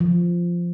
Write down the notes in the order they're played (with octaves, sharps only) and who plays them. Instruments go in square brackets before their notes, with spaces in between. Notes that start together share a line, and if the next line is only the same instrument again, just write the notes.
[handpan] F3